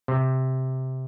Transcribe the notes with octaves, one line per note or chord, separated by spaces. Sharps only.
C3